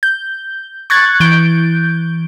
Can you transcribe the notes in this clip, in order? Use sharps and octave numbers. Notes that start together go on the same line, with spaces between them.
G6
C#6 F#6 G#6 A6
E3 G6 D7